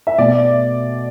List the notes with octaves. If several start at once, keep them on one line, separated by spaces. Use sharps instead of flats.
E5
B2 A3 D5